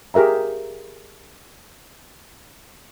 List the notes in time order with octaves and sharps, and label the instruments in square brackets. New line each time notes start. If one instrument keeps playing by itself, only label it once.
[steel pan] G4 G#4 A#4 E5 A#5